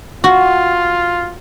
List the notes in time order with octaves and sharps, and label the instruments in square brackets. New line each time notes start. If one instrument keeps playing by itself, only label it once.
[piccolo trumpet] F4 [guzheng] F#4